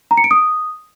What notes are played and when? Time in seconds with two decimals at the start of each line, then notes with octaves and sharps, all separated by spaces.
0.11 A#5
0.17 C#7
0.24 D7
0.31 D#6